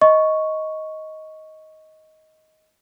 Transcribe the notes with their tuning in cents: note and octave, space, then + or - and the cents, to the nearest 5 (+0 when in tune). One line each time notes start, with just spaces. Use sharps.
D#5 +10 C#6 +0